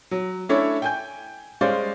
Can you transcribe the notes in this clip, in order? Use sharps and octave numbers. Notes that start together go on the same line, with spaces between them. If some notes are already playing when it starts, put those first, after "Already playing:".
F#3
A3 C#4 D4 E4 C#5 E5
G5 G#5 G6
G3 G#3 C#4 C5 D5 F5